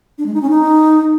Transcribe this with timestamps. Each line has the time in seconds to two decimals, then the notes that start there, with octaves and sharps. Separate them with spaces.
0.18 D4
0.26 G#3
0.34 D#4
0.42 C#4
0.50 D#4